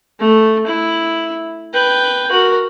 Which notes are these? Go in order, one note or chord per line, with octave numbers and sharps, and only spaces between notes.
A3
E4
B4 G5
F#4 A#4